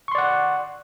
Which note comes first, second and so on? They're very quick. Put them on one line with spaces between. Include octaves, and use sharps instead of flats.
C#6 C6 D5 F#5